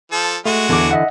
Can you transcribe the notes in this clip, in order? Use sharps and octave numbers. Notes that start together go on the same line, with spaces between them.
F3 A4
G#3 A3 F#4
E2 D3 E3 D6
D#5 E5 F#5